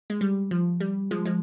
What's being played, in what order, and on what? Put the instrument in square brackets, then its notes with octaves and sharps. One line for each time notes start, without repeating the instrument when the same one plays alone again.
[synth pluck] G#3
G3
F3
G3
F3 G#3
F3 G#3